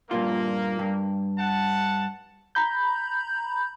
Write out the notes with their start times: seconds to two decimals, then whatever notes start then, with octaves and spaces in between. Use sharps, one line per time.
0.11 G2 A#2 A#3 F4
0.79 G2
1.39 F#5 A5
2.55 A#5 B5 G6